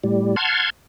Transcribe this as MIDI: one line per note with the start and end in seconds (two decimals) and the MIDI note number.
0.04 0.36 45
0.04 0.36 55
0.36 0.70 78
0.36 0.70 81
0.36 0.70 84
0.36 0.70 89
0.36 0.70 92